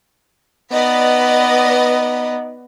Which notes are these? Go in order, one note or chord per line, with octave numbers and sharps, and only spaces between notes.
B3 D#4 B4 D5 D#5